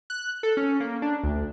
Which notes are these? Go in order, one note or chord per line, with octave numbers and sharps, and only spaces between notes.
F#6
A4
C#4
A#3
D4
D2